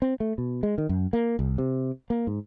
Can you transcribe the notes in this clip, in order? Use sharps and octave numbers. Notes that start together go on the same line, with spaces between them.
C4
A3
B2
G#3
D#3
F#2
A#3
C2
C3
A#3
G#2